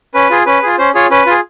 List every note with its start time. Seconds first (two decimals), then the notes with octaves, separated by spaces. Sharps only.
0.14 C#4 B4
0.30 F4 G#4
0.46 C#4 B4
0.63 F4 G#4
0.78 C#4 C5
0.94 F4 G#4 C#5
1.10 C#4 B4
1.27 F4 G#4